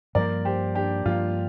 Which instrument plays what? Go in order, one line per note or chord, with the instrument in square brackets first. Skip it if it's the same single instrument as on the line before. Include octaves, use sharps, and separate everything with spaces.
[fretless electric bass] G2 F3 A#3 [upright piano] A#4 D5
[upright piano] G4 C5
D4 G4
[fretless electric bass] G2 F3 A#3 [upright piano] F4